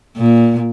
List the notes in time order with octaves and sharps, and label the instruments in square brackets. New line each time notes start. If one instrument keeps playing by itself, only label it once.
[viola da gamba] A#2